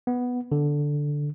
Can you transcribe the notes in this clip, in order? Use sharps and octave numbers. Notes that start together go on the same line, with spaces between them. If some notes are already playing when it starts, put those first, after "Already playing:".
B3
D3